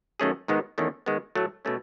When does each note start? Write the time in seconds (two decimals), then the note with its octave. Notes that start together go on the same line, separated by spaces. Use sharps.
0.20 F#2 D#3 A3 C#4 G#4
0.48 G#2 D#3 G#3 B3 D#4
0.78 E2 D#3 A3 C#4
1.06 D#3 G#3 B3
1.35 A2 F#3 A3
1.65 B2 A3 C#4